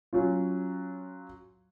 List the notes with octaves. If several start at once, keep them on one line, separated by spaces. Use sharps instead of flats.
F#3 C#4 F4